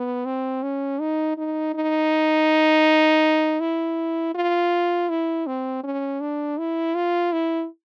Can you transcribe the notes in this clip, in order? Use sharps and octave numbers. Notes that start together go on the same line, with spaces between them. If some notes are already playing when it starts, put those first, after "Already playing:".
Already playing: B3
C4
C#4
D#4
D#4
D#4
E4
F4
E4
C4
C#4
D4
E4
F4
E4